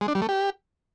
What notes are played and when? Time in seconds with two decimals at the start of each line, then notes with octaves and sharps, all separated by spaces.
0.01 G#3
0.08 D4
0.15 G3
0.22 A3
0.29 G4